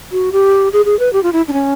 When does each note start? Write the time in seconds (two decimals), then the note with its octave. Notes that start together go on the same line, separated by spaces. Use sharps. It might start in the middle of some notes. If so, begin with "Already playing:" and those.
0.12 F#4
0.32 G4
0.73 G#4
0.85 G#4
0.99 B4
1.13 G4
1.23 F4
1.33 E4
1.48 D4
1.53 C#4